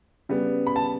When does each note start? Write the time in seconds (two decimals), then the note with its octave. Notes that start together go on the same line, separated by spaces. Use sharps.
0.29 C#3 G3 B3
0.67 B5
0.76 A5